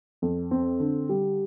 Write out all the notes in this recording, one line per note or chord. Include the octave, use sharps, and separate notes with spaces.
F2
C4
D3
G3